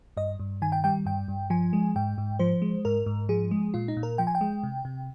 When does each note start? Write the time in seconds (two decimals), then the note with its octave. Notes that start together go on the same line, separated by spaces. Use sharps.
0.17 G2 D#5
0.40 G2
0.62 D#3 G#5
0.72 G5
0.84 G3 G5
1.06 G2 G5
1.28 G2
1.50 F3 G#5
1.73 G#3
1.96 G#2 G5
2.18 G#2
2.39 F3 C5
2.62 G#3
2.85 G#2 A#4
3.06 G#2
3.29 F3 G#4
3.51 G#3
3.74 A#2 F4
3.88 D#4
3.97 A#2
4.03 A#4
4.18 F3 G5
4.27 G#5
4.35 G5
4.41 G#3
4.63 C3
4.85 C3